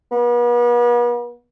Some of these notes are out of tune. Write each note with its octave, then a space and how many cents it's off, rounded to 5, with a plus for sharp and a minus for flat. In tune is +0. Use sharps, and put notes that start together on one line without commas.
B3 -40